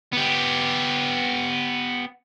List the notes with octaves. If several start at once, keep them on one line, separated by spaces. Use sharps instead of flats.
B3 G4